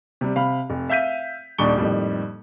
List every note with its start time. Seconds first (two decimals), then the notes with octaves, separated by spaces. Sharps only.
0.21 C3 G3
0.36 C3 F5 B5
0.70 F1
0.90 E5 F5 G6 B6 D#7
1.58 D#1 G3 D4 D#4 C#6 G7
1.78 F2 A2 D#3 G3